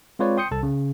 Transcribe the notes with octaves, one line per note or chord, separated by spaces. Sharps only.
G#3 C4 F4 B4 C#5 D5
G5 C6 D#6 G6 C#7
C2 A4 A5
C#3